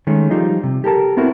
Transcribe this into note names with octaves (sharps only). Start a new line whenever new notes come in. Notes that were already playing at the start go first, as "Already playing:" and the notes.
D#3 G#3 A3 C#4
F3 G3 D#4 F4 D#5
C3
G4 A4 A#4 A5
B3 C4 E4 F#4 A#4